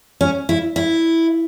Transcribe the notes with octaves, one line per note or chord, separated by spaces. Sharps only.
C#4
E4
E4